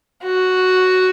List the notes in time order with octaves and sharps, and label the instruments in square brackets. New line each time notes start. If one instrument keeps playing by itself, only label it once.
[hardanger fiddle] F#4